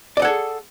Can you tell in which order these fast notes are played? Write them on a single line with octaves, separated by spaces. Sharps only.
D5 D#5 F#5 A4 G#4